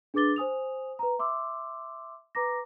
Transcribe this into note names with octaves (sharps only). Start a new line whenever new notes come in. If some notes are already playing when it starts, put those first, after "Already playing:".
D4 G#4 B4 D6 A6 G7
C5 G#5 D#6 F7
B4 A#5
E5 C6 D6 E6
B4 A#5 D6 A#6